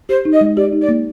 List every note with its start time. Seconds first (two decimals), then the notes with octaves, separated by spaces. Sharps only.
0.09 G4 C5
0.25 D#4
0.33 D#5
0.41 G#3
0.57 G4 D5
0.73 D#4
0.81 D5
0.89 A#3